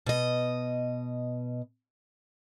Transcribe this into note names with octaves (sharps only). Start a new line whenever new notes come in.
B2 D#5